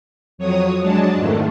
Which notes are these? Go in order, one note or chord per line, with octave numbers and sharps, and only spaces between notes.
F2 F#3 C#5 D#6
F#3 G#3 D4 A5
F2 G#2 D#3 G#3 A3